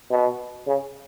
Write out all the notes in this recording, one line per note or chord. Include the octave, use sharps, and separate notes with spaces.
B2
C#3